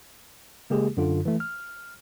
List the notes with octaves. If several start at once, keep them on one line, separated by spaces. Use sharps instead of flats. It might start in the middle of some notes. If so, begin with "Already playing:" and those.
C#3 G#3 A#3 G4 G#4
F#2 D3 F4
E3 A3
F6